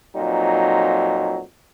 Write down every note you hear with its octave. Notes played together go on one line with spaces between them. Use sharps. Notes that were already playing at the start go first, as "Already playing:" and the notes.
F2 A#2 F#3 D#4